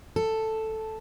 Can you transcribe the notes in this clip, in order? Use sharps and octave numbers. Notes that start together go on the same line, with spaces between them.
A4